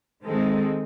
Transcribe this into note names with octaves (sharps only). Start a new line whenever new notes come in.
D#3 G#3 C4 D#4 G#4 A4